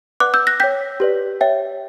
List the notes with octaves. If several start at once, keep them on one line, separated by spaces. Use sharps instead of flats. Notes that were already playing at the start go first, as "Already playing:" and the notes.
B4 D5 F#5 D6 F#6
E6 G6
F#6 A#6
C#5 G5 G6 B6
G4 B4 D5
C#5 E5 G5